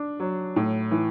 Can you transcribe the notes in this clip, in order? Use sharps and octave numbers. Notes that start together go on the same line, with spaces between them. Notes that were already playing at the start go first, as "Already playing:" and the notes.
Already playing: D4
F#3
A2
E3